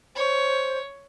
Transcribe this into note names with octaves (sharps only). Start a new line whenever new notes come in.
C5 C#5